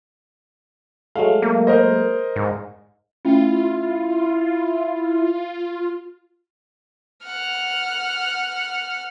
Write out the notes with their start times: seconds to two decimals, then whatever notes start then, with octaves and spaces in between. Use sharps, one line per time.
1.15 F#3 G#3 A3 F5
1.42 A#3
1.67 A#4 C5 D#5
2.36 G#2
3.25 A3 C#4 E4 F4
7.25 F#5 F6